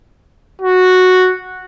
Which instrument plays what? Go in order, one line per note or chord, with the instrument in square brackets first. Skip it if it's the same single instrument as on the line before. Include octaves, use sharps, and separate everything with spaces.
[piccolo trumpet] F#4